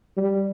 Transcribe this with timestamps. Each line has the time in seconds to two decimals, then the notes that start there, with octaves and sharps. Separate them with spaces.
0.17 G3